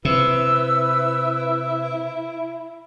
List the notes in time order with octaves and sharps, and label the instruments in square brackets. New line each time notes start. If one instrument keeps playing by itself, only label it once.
[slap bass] C3 [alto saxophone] E4 [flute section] B4 E6